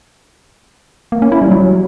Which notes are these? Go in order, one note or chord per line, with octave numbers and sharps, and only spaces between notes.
A#3
C#4
E4
G3
F#3